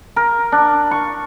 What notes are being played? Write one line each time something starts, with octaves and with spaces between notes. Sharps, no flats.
A#4
D4
C#6